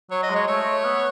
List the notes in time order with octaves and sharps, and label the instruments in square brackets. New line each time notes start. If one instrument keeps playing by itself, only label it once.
[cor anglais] F#3 [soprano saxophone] C#5
[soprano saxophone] D#5
[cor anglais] G#3
[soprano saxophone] C#5
[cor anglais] A3 [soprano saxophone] C#5
[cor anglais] B3